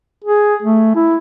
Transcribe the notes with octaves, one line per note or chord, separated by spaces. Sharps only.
G#4
A3
E4